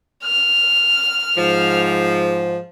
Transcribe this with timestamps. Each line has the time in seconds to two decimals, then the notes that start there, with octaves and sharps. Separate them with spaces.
0.24 F6
1.37 G#2 F3